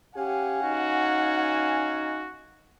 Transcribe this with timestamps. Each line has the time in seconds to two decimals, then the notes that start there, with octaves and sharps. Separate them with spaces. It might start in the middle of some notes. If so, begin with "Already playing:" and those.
0.16 C#4 G4 F5 F#5 G#5
0.64 D#4 F#4